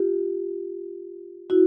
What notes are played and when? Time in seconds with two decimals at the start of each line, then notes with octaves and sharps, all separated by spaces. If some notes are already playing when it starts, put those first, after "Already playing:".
Already playing: F4 G4
1.50 E4 F#4